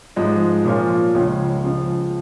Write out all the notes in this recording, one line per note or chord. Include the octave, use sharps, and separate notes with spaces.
G#2 F3 G#3
A#2 F3 C#4 F4
C#2 C#3 F3 C#4
C#3 F3 G#3